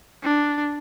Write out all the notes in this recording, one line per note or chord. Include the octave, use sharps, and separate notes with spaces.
D4